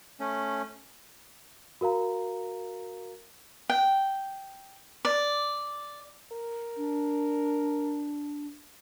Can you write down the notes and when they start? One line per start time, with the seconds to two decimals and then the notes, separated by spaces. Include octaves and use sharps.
0.20 A3 C#4
1.81 F#4 A#4 F5 A#5
3.70 G5
5.05 D5
6.32 A#4
6.77 D4